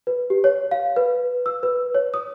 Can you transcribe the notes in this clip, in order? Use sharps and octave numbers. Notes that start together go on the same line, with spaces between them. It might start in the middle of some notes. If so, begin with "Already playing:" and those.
B4
G4
C#5
F5
B4
E6
B4
C#5
D#6